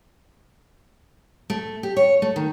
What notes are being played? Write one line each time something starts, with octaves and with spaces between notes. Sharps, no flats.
A3
G4
C#5
A3
D#3